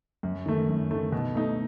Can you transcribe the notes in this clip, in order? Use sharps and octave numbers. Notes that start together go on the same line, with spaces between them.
F#2
D#3 A3
F#2
D#3 A3
B2
A3 D#4